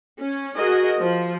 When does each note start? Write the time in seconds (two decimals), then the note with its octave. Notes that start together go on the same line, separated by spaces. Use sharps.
0.20 C#4
0.57 F#4 G#4 A#4 D#5
1.00 F3